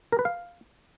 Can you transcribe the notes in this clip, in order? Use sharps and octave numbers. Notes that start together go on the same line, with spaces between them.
A#4
B4
F5